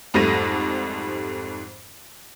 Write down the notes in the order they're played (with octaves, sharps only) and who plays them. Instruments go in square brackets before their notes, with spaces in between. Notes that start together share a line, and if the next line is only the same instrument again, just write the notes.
[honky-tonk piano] F2 G#2 G3 A3 A#6 D#7